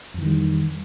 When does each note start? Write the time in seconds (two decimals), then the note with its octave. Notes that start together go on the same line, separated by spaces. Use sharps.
0.14 F2
0.18 E3
0.22 D#3
0.26 G3